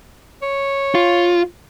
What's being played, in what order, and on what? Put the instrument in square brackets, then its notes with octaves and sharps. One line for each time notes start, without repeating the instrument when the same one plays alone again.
[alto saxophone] C#5
[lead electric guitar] F4